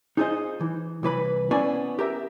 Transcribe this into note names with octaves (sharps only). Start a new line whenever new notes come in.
D#4 F4 G#4 A4 C5 D#5
E3
C2 E3 B4 B5
B3 C#4 E4 C5 D5 G#5
G4 A#4 E5